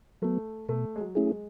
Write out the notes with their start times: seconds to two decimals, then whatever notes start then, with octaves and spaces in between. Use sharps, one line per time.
0.22 F#3 A3 B3
0.69 B2 A3
0.96 G#3
1.00 F#3
1.15 A3 C#4 E4 G#4
1.31 G#3